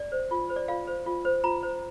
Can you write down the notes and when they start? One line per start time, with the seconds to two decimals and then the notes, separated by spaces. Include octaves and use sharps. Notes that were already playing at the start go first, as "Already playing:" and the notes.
Already playing: D5
0.12 C5
0.31 F4
0.50 C5
0.56 D5
0.68 F4 F5
0.87 C5
1.06 F4
1.25 C5
1.44 F4 A#5
1.63 C5